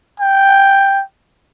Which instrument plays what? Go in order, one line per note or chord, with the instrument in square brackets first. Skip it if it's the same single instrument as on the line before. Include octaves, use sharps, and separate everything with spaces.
[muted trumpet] G5